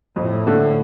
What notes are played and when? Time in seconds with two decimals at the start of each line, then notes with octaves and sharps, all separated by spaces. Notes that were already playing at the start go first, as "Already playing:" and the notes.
0.16 F2 A2
0.47 D3 A3